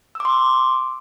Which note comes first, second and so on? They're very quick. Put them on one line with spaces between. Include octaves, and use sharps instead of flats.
E6 D6 C6